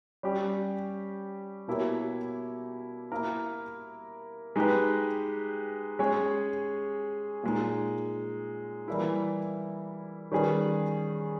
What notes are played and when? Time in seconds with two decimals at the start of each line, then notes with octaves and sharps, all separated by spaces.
0.23 G3 C#4 G4
1.68 B2 A#3 E4 G4 C#5
3.12 A#3 E4 A#4
4.56 G#3 D#4 G4 B4
5.99 G#3 C#4 G#4 C#5
7.43 A#2 G#3 D#4
8.88 E3 G3 A#3 E4
10.32 D#3 G3 C#4 G#4 B4